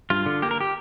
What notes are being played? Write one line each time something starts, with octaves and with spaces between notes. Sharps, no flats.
G2 F4
D3
A#3 G4
A#4
G4